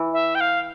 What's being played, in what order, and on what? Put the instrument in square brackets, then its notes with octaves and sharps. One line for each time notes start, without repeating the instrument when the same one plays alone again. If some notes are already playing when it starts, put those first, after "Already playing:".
Already playing: [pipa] E3
[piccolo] E5
G5
F5